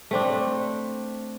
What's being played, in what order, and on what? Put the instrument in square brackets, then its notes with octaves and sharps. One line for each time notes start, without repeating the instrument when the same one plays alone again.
[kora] A3 C4 D4